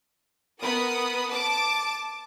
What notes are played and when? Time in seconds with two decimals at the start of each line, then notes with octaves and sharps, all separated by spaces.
0.62 B3 A#4 B5 D#6
1.29 A5 D6 D7